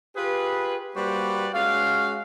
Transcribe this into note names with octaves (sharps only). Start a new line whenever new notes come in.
F4 G4 G#4 B4
G3 A#3 F#4 B4 C5 D5
G#3 C#4 F#4 F5